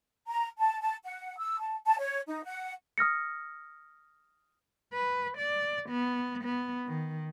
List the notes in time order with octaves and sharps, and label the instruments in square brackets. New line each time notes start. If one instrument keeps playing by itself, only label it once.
[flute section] A#5
A5
A5
F#5
E6
A5
A5
C#5
D#4
F#5
[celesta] D#6 F6 A#6 C#7
[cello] B4
D5
B3
B3
D#3